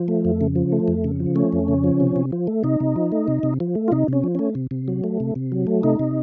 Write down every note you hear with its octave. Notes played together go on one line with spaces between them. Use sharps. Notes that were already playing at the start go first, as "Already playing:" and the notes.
Already playing: F3
A3
F2
C#3
F3
A3
F2
C#3
F3
A3 C#4
F2
C#3
F3
C3
C3
F3
A3
C3 D#4
C3
F3
A3
C3
C3
F3
A3
F4
C3 D#4
C3 C#4
F3
A3 C#4
C3
C3
F#3
A3
C3
C3
F#3
A3
C3 D#4
C3